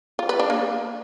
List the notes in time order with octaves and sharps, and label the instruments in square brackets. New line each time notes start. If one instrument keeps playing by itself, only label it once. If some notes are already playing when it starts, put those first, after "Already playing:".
[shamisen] F4
B4
D4
A#3